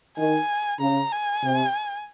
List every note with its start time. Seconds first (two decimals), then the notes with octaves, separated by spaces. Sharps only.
0.17 D#3 G#5
0.80 C#3 A#5
1.12 G#5
1.43 C3